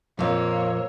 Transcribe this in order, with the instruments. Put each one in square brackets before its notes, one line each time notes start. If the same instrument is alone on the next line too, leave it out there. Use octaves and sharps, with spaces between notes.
[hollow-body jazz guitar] F2 A#2 [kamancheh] A#3 C#5 [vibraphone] C5 F5 E6